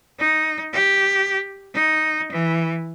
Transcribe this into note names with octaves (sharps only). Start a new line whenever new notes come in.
D#4
G4
D#4
E3